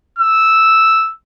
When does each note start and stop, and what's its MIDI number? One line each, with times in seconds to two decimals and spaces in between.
0.19 1.12 88